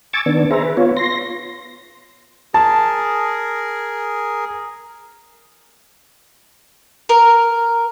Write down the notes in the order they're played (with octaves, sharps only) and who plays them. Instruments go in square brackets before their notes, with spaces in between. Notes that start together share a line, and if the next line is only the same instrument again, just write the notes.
[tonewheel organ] G#5 C#6 D6 E6 A6
D#3 B3 D4
G#4 B4 C5 E5 A#5
B4
B3 F4 C#5
C6 A#6
[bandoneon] G#4 A#4 [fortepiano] A5
[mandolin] A#4